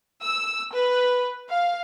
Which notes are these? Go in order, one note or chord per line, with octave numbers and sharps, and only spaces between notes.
E6
B4
F5